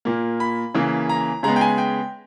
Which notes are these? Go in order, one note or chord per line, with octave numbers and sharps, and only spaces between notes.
A#2 A#3
B5
C#3 E3 A#3
A#5
C#3 G#3 B3 A#5
G5
G#5
G5